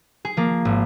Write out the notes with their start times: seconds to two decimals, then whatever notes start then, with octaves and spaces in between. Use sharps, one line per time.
0.25 G#4
0.37 F3 A#3
0.65 G#1